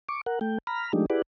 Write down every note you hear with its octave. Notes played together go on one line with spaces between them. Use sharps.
C#6 D6
A#4 F#5
A3 G5
A#5 B5 F6
F3 G#3 A3 D4 D#4 G4
E4 G4 G#4 B4 D5 F#5